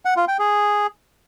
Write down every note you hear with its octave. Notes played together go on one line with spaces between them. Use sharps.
F#5
F4
G5
G#4